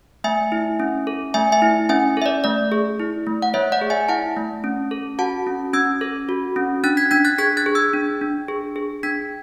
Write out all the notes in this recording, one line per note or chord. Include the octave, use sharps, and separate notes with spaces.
A3 E5 G#5
E4
C#4
A4
A3 E5 G#5
E5 G#5
E4
C#4 E5 G#5
A4 E5
D5
A3 D5
G#4
E4
A3
F#5
A3 C#5 E5
D5 F#5
G#4
E5 G#5
E4 F#5 A5
A3
C#4
A4
F#4 F#5 A5
C#4
C#4 E6 G#6
A4
F#4
C#4
D4 F#6 A6
G#6 B6
D4 G#6 B6
F#6 A6
G#4 G#6 B6
F#6 A6
G#4
E6 G#6
D4
D4
G#4
G#4
D4 G#6 B6